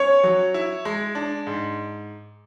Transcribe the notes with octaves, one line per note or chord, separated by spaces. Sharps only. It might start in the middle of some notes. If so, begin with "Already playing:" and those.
Already playing: C#4 C#5
F#3
E4
G#3
D4
G#2